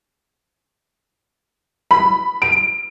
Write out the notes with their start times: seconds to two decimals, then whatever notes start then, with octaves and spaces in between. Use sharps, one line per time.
1.91 B5
2.42 D7